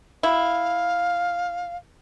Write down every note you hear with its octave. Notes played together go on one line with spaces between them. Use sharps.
E4 F5